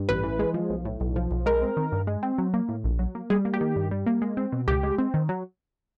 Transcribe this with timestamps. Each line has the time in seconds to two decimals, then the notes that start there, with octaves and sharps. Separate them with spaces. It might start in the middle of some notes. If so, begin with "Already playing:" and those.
Already playing: G2
0.09 A1 B4
0.24 E3
0.39 G#3
0.54 F3
0.70 B1
0.85 A2
1.00 B1
1.16 F3
1.31 B1
1.46 G#3 A#4
1.62 C4
1.77 D#3
1.92 G2
2.07 G#3
2.23 C4
2.38 F#3
2.54 A#3
2.69 A2
2.84 A#1
2.99 F#3
3.15 A#3
3.30 G3 G#4
3.45 A#3
3.54 G4
3.61 D#3
3.76 G2
3.91 G3
4.06 A#3
4.22 G#3
4.37 C4
4.52 B2
4.67 C#2 G4
4.83 G#3
4.98 C4
5.14 D#3
5.29 F#3